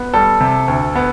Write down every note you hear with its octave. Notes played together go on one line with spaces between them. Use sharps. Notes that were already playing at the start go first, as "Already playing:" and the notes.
Already playing: B3
G3 A4
C3
D2
B3